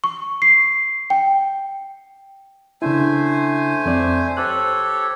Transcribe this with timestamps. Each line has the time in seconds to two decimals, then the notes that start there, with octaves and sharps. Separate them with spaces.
0.04 C#6
0.42 C7
1.10 G5
2.82 C#3 A3 D4 E4 C5 G#5
3.86 F2 C4 D5
4.37 G4 A4 C5 C#5 F#6